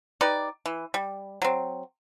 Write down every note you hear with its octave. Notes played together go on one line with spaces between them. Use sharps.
D#4 G4 B4 D5
E3
G3
F#3 C4